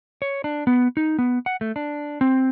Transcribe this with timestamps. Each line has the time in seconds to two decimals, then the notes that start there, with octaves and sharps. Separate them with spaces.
0.22 C#5
0.44 D4
0.67 B3
0.97 D#4
1.19 B3
1.46 F#5
1.61 A3
1.76 D4
2.21 C4